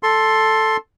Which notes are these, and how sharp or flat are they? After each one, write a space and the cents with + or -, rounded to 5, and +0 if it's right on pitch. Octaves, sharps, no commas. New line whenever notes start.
A4 +0 C6 +10